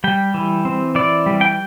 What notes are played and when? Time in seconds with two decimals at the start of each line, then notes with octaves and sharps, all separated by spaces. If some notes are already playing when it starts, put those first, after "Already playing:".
0.04 G3 G5
0.34 E3
0.65 C4
0.95 E3 D5
1.26 G3
1.41 G5